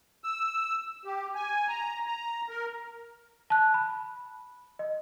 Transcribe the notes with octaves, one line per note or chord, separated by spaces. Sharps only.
E6
G4
G#5
A#5
A#5
A#4
A5 F#6
B5
D#5